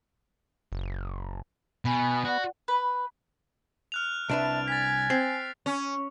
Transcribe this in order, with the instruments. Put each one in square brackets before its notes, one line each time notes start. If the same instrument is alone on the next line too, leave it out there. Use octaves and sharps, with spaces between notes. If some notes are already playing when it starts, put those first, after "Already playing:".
[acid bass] F#1
[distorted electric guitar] B2 [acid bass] B3 [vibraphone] G#5 B5
[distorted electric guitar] F#4 [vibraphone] D5 F#5
[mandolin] B4
[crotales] F6 F#6 F7
[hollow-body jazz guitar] C2 D4 B4 [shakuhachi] E5 [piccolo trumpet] A5 [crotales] D7
[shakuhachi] G#5 [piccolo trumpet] G#6 [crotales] A6 B6
[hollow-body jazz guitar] C4 [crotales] C7
[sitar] C#4